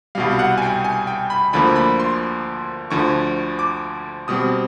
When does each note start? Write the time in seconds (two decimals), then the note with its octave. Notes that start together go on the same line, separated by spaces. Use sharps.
0.15 C2 B2 G3 F5
0.31 F5
0.39 F#5
0.58 G#5
0.62 G5
0.84 G#5
1.07 G5
1.30 B5
1.53 D2 D3 F3 A#3 B5
1.76 B5
2.00 C6
2.90 D2 D3 F3 C#6
3.59 D6
4.28 B2 G3 C4 D#6